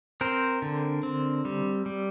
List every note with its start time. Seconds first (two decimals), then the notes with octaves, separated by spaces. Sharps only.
0.21 C4 A#4 C5
0.62 D3
1.03 C4
1.45 G3
1.86 G3